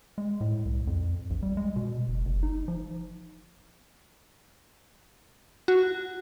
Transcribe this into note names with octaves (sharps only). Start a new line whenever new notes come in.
G#3
A2
C2
F2
A#1
G3
G#3
B2
F#1
F#1
D#4
F3
F#4